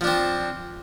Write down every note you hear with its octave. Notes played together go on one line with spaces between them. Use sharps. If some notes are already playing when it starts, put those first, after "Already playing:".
F3 C4 D4